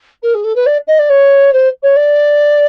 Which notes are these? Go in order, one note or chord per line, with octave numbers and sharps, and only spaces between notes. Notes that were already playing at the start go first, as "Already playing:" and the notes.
A#4
G#4
A4
B4
D5
D#5
D5
C#5
C5
C#5
D5